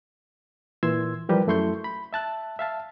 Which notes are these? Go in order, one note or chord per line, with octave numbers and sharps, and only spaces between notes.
A#2 E3 C6 E6 G#6
E3 F3 G3 G4 A#4 B4
F#2 A3 E4 C6 C#6 G6
B5
E5 A5 F#6
E5 F5 A5